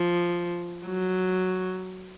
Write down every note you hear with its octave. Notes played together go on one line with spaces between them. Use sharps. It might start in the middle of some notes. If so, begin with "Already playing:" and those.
Already playing: F3
F#3